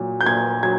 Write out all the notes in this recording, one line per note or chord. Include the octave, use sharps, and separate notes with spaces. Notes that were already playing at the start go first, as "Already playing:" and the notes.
Already playing: A#2 F#3
G6
A#2 G#6
F#3 G#6